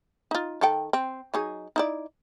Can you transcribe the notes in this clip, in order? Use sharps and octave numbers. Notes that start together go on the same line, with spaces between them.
D#4 F4
D#3 A4 G5
C4
F#3 D#4 G#4
D#4 E4 D5